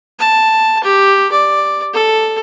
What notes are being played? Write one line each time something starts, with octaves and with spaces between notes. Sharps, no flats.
A5
G4
D5
A4